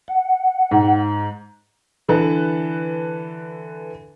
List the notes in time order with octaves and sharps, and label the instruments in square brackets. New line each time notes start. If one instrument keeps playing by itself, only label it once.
[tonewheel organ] F#5
[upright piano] G#2
[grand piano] D3 E3 A4 B4